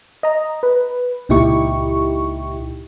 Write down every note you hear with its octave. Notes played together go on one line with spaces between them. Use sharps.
D#5 A#5
B4
C#2 A#2 D#4 E4 G4 C#6